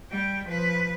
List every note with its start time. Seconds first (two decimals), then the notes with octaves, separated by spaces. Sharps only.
0.11 G3 G5
0.47 F3 B4